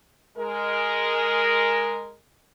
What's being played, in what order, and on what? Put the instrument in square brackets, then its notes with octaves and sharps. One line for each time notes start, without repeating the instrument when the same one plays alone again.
[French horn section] G#3 A#4